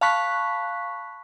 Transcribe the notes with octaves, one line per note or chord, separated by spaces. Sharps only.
F5 A5 B5 C#6 F#6 B6